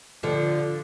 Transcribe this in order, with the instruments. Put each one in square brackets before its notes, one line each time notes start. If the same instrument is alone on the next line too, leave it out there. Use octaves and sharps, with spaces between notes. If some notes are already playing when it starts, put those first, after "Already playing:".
[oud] D3 F3